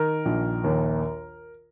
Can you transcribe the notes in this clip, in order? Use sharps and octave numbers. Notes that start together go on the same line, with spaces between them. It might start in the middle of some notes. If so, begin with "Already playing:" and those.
Already playing: D#3 A#4
A#1
D#2